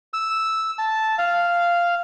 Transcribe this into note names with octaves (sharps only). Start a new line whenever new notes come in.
E6
A5
F5